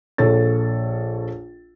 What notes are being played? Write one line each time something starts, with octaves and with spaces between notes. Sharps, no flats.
A#1 A4 C#5 A6